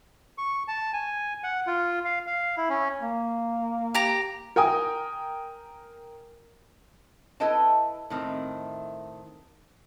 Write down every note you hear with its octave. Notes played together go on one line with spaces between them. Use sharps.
C#6
A5
G#5
F#5
F4
F5
F5
E4
C#4
A#3
G4 A#5
A#4 G5 G#5 D#6
E4 A4 B4 D#5 G5 A5
A2 D#3 A3 C4